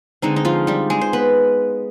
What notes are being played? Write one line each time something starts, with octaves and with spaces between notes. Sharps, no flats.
D3 G#3 C4 D#4
D#4
F3 F4
G3 G4
G#3 G#4
C5
B3 B4